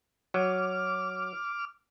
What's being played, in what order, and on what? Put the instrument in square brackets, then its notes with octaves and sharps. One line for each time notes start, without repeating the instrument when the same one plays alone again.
[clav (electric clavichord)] F#3 [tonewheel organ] D6 F6